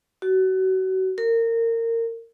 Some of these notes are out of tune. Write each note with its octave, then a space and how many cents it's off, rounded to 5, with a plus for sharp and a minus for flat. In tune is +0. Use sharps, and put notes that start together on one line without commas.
F#4 +30
A#4 -25